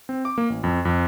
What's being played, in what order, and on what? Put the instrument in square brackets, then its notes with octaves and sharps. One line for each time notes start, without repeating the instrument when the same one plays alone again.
[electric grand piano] C4
D6
A#3
A1
F2
F2